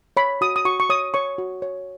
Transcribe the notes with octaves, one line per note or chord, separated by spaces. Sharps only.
C#5 B5
F#4 D#6
D#6
F#4 C#6
C#6
C#5 D#6
C#5 C#6
F#4
C#5